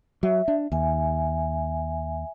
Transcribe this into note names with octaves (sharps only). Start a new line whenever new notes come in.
F#3 E5
D4
D#2 E5 G#5